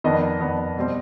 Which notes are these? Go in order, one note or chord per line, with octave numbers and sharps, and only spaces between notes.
F2 D#3 B3 D4 D#5
F2 D#3 B3 D4
B2 G3 C4